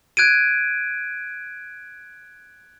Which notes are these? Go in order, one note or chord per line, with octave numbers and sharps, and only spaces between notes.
F#6 G#6 D7 D#7